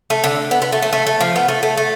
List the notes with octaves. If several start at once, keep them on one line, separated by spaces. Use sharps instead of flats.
A3
D3
B3
B3
A3
A3
A3
A3
F3
B3
A3
A3
A3